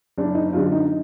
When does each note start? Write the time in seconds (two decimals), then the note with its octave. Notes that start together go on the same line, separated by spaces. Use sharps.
0.18 F#1 D4
0.35 D#4
0.53 F#2 D3 F4
0.72 D#4